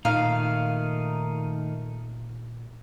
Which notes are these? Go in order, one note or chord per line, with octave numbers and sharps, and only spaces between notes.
A#2 D#3 A3 D#4 F5